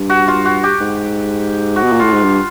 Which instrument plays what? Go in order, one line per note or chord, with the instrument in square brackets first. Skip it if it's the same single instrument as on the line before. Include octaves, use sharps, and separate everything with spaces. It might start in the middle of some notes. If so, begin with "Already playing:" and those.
Already playing: [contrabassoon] G2
[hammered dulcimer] F#4
F4
F#4
G4
[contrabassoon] G#2
[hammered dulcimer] F#4
[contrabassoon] B2
A#2
[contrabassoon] A2 [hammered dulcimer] F4
[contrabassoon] G#2
G2